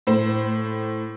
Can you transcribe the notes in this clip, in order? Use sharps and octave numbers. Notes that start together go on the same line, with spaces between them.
A2 C5